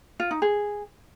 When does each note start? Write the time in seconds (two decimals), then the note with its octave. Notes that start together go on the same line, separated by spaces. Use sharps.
0.20 F4
0.31 D#4
0.42 G#4